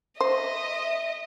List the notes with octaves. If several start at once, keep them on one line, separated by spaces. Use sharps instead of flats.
C5 D#5 E5